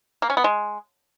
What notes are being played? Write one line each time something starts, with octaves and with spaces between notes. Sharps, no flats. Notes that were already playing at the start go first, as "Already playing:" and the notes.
A#3
C#4
B3
G#3